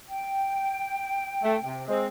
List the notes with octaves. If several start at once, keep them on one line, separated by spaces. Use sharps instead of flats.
G5
A3
C3
G#3 C4